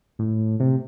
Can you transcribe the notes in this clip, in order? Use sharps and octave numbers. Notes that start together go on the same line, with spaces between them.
A2
C3